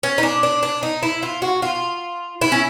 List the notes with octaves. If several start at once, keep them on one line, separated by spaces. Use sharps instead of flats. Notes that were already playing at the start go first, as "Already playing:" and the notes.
C#4
D#4
D4
D4
D4
D#4
E4
F4
F#4
F4
E4
C#4